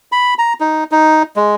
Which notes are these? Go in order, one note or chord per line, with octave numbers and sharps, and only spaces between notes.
B5
A#5
D#4
D#4
G#3